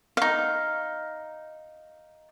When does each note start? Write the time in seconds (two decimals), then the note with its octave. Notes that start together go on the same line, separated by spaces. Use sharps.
0.17 D#4 F5